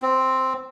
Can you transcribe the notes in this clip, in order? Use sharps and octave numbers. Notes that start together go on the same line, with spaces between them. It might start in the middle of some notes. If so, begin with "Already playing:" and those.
C4